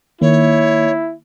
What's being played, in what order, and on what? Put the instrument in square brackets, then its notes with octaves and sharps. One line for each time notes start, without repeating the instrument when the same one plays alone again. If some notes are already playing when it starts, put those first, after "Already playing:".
[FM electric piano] D#3 A#3 [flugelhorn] E4 [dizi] C#5